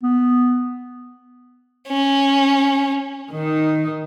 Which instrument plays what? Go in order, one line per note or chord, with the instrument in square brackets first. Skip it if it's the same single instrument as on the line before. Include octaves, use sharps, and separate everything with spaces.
[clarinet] B3
[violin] C#4
[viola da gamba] D#3 D#4